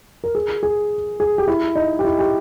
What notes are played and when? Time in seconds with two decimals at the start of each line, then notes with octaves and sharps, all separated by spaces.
0.24 A#4
0.35 G#4
0.63 G#4
1.20 G#4
1.38 G4
1.48 E4
1.75 D#4
1.99 G4
2.04 E4
2.19 G4